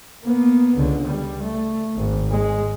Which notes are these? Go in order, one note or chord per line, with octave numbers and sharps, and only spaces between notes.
A#3 B3
C#2 D3
G3
A3
G#1
G#3